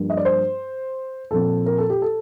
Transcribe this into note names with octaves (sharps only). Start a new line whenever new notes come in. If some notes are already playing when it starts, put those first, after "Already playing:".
Already playing: G2 F3 A#3
D#5
D5
C5
A#2 F3 C4 A4
A#4
A4
G4
A4